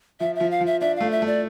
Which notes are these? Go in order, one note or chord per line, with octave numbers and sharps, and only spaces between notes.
F3 E5
F3 E5
F5
F3
E5
D4 E5
A3 F5
E5
A3 D5